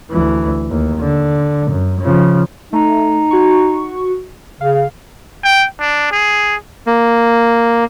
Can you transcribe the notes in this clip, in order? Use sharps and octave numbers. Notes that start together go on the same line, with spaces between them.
D2 E3
D#2
D3
F#2
C#3 F3
A3 D#4
F#4 C#6
C#3 F5
G5
D4
G#4
A#3